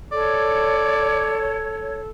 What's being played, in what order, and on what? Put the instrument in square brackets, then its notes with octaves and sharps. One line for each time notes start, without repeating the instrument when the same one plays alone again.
[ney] A4 [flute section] C#5 [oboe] D5